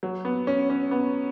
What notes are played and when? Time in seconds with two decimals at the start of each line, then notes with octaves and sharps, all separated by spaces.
0.03 F#3
0.25 B3
0.47 C#4
0.70 C#4
0.91 B3